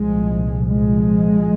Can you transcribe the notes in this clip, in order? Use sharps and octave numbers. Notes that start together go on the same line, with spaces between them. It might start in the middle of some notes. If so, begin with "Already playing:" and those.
Already playing: C2 A#2 F3 G#3
F3 G#3